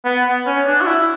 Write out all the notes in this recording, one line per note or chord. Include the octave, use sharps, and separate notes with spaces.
B3
B3
C#4
D4
F#4
E4